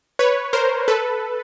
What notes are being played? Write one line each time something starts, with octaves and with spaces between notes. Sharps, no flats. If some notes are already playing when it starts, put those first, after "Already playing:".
B4 C#5
A#4 C5
A4 B4